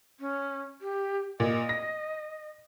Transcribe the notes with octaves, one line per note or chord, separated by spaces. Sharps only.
C#4
G4
A#2 D#5
A#6